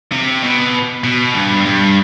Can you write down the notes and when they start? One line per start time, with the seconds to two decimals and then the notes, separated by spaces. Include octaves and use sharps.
0.12 C3
0.43 B2
1.04 B2
1.34 G2
1.65 G2